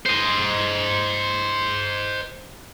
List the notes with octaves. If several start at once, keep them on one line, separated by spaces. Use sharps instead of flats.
C5 D#5